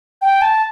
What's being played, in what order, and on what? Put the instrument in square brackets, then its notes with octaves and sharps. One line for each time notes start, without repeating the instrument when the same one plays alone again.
[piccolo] G5
A5